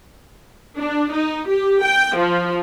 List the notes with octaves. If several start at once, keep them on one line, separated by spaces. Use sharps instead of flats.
D4
D#4
G4
G5
F3